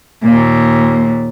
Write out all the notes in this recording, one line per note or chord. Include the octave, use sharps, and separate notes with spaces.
D#2 A#2